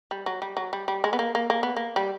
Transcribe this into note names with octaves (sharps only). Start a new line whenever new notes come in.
G3
F#3
G3
F#3
G3
G3
G#3
B3
A#3
A#3
A#3
B3
A#3
G3